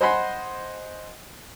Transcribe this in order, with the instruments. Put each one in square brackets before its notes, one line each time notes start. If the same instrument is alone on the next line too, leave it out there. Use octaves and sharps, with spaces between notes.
[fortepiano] C5 D#5 F#5 G#5 B5 C6